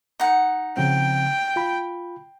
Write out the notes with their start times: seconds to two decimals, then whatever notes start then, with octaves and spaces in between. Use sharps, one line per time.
0.20 D#4 F#5
0.77 C#3 F3 C4 G5
1.56 F4 B5